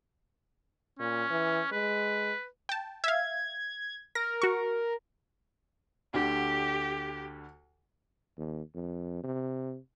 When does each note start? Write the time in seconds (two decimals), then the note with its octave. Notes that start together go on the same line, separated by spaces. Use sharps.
0.99 A#2 C#4
1.30 E3
1.72 G#3 B4
2.69 G5 A5
3.04 E5 F5 G#6
4.15 A#4 A#6
4.42 F#4 C#6
6.14 D2 D3 G4
8.38 D#2
8.75 F2
9.23 C3